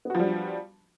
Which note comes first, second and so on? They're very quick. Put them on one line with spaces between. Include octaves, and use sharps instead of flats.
B3 F#4 F3 G3 D4